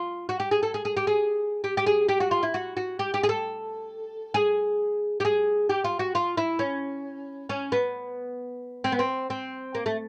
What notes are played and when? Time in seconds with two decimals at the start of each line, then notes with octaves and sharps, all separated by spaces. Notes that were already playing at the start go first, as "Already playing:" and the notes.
Already playing: F4
0.29 F#4
0.40 G4
0.51 G#4
0.63 A4
0.74 G#4
0.85 G#4
0.97 G4
1.07 G#4
1.64 G4
1.77 G4
1.87 G#4
2.09 G4
2.20 F#4
2.31 F4
2.43 E4
2.54 F#4
2.77 F#4
2.99 G4
3.14 G4
3.24 G#4
3.29 A4
4.34 G#4
5.20 G4
5.25 G#4
5.69 G4
5.84 F4
5.99 F#4
6.15 F4
6.37 E4
6.59 C#4
7.49 C#4
7.72 B3
8.84 C4
8.92 B3
8.99 C4
9.30 C4
9.75 A#3
9.86 A3